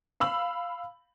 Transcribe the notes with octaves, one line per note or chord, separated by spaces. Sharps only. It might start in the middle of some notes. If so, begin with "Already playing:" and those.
F5 B5 E6 F#7